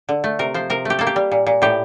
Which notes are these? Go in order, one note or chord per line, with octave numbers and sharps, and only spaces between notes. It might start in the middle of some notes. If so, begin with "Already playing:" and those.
D3
A3
C3 A#4
F3 C5
C3 A#4
A3 G4
A#3 A4
G4
G3
A#2
A#2
A2 G4